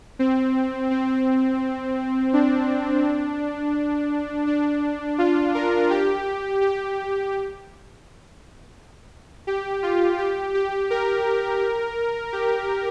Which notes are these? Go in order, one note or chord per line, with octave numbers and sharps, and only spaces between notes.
C4
C4
D4
D4
F4
A#4
G4
G4
G4
F4
G4
G4
A#4
G4